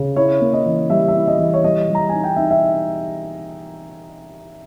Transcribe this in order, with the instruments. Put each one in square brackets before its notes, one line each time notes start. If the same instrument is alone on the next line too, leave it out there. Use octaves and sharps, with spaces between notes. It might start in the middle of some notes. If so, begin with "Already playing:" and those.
Already playing: [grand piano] C#3
E4 C#5
A#3
D#5
E3
G3 E5
E5
E4
D#5
E3
C#5
G3 D#5
G3
A#5
D#4 G#5
G5
D#4 E5
E5